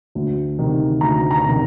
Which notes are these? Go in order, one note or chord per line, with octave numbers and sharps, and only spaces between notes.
D2
C3 D#3
D2 A#5
A#5
C3 D#3